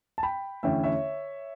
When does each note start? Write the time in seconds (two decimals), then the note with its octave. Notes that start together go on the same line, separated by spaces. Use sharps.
0.18 A5
0.23 G5 B5
0.63 E2 D3 A3 C#4 E4 E5 G5
0.84 C#5 E5